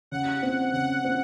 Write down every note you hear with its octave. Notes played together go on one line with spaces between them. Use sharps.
C#3 F#5
C4
C#3 F#5
C4